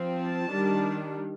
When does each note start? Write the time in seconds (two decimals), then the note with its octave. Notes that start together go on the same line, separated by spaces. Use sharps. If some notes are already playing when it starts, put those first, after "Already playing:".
Already playing: F3 C4
0.19 A5
0.51 D#3 G3 D4